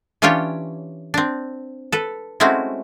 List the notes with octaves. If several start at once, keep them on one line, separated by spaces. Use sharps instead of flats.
E3 C#4 D4 F4 G4 C#5
C4 D4
A4 B4
G#3 A3 C4 C#4 E4 F#4